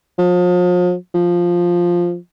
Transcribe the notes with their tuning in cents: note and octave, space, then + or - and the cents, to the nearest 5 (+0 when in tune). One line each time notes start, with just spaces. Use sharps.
F3 +40
F3 +0